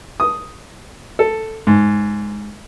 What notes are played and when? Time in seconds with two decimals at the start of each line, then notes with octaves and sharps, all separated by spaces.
0.20 D#6
1.19 A4
1.67 G#2